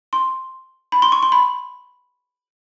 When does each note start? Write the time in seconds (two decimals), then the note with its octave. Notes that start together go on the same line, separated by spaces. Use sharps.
0.13 C6
0.92 B5
1.02 C6
1.12 C#6
1.23 C6
1.32 B5